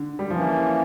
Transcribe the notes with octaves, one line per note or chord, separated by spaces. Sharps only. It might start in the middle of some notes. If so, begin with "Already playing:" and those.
Already playing: D3
G3
E3 F3 A#3 C#4